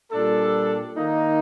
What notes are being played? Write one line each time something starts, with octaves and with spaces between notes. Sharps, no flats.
A#2 G3 D4 A4
D#3 A#3 D#4